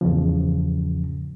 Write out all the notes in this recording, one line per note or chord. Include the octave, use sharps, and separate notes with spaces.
E2 G#2 C#3 F3